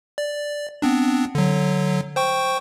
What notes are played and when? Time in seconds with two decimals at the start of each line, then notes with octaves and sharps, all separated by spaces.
0.18 D5
0.82 B3 C4 D4
1.35 D3 F#3
2.16 C5 G5 C#6